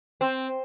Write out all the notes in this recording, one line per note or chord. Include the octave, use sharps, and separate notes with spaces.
C4